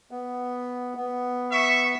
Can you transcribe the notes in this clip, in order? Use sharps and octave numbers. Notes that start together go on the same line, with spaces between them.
B3
B3
E5 C#6